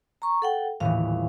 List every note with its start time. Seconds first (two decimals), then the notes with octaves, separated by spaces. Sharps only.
0.22 A#5 C#6
0.42 A4 F#5 G5
0.80 D#1 A2 E3 F5